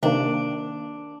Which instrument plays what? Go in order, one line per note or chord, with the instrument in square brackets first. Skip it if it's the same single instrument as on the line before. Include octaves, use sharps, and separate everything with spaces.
[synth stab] C3 D#3 A#3 [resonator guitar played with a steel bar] D4